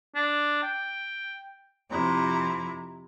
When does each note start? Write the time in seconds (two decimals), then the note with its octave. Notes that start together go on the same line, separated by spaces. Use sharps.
0.15 D4
0.63 G5
1.90 F2 C3 E4 A#5